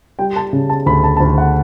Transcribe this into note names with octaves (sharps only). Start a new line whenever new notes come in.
G3 G5
A5
C#3
A5
D2 B5
A5
A5
D2 B5
F#5